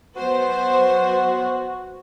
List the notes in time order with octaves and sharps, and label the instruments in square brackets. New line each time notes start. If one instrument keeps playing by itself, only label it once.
[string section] F#3 B3 C5 [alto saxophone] F#4